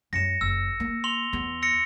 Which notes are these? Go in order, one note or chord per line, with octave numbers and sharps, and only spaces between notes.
F#2 G3 A#6 C#7 E7
F#1 E6
A#3
C6 F7 G7
E2 B3
E6 A#6 C#7